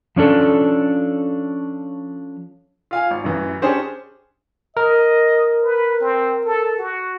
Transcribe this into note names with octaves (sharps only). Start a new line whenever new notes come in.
F3 C#4 D4 A4
F4 F5 G#5
G#1
A1 F#2 E3
C#4 D4 G4 G#4 C5 C#5
A#4 D#5
B4
C4
A4
F#4